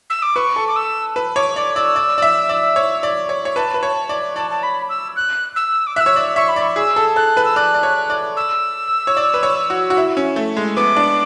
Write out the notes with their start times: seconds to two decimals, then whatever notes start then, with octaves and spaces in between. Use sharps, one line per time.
0.10 E6
0.22 D6
0.36 B4 C#6
0.56 A4
0.67 D6
0.76 E6
1.16 B4
1.36 C#5 D6
1.56 D5 D6
1.75 D5 E6
1.96 D5
2.18 D5
2.22 E5
2.49 D5
2.76 C#5
3.03 D5
3.29 C#5
3.45 C#5
3.56 B4 A5
3.74 B4
3.83 C#5
4.09 D5
4.36 D5 A5
4.51 A5
4.63 B5
4.89 E6
5.16 F#6
5.56 E6
5.87 D6
5.96 E5 E6 F#6
6.06 C#5
6.16 D5
6.36 E5 C#6
6.48 B5
6.56 D5
6.62 C#6
6.76 G#4 E6
6.96 A4
7.16 A4 F#6
7.37 B4
7.45 E6
7.56 D5 F#6
7.74 D5
7.83 C#5
8.10 D5
8.36 E6
9.07 C#5
9.17 D5
9.34 B4
9.43 C#5
9.70 F#4
9.90 F#4
9.97 E4
10.17 C#4
10.36 A3
10.57 G#3
10.76 B3 D6
10.96 D4